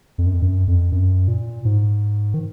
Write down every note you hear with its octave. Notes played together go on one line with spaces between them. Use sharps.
F2
F#2
F2
F#2
F2
F#2
A#2
G#2
D#3